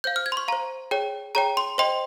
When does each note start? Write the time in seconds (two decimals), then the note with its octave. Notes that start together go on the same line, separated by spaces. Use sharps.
0.04 C5 F5 G6
0.16 F6
0.26 G#6
0.32 C6
0.37 C#6
0.48 C5 F5 A#5
0.91 G#4 C#5 G5
1.35 G#4 C#5 G5 A#5
1.57 C6
1.78 C5 D#5 G5 C6